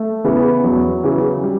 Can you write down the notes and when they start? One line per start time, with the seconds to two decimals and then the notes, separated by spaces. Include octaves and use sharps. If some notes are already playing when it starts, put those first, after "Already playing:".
Already playing: A3
0.24 C#3 E3 B3
0.64 E2 F#3
1.04 C#3 E3
1.44 G3